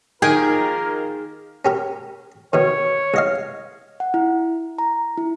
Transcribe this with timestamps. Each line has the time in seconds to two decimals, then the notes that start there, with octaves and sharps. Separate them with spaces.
0.22 D#3 A#3 F4 G#4 A#4 G5 G#5
1.65 C#4 G4 A#4
2.53 B2 D#3 C#5
3.14 C2 D#5 F5
4.00 F#5
4.14 E4
4.78 A#5
5.18 E4